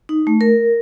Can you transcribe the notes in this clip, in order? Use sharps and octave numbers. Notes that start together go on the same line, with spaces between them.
D#4
A3
A#4